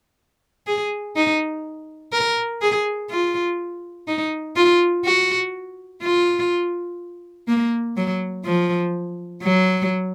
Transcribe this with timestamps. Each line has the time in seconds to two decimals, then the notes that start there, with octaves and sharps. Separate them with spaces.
0.67 G#4
1.16 D#4
2.13 A#4
2.62 G#4
3.10 F4
4.08 D#4
4.56 F4
5.05 F#4
6.03 F4
7.48 A#3
7.97 F#3
8.46 F3
9.43 F#3